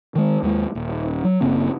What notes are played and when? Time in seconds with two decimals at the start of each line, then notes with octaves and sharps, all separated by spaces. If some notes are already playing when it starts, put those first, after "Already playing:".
0.15 D#3 G#3
0.43 D#2 G#3
0.75 D#1
1.24 F#3
1.41 F#1 C#3 A#3 C4